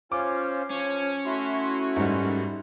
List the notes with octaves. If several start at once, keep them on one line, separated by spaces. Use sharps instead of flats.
C#4 F4 C5 D6
F3 C#4 C#5
A3 E4 F#4 E5 C6
G#2 G3 D#4 A#4